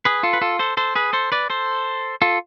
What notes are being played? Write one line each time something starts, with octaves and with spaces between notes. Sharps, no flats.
G#4 B4
F4 A4
B4
F4 A4
A4 C5
A4 C5
G#4 B4
A4 C5
B4 D5
A4 C5
F4 A4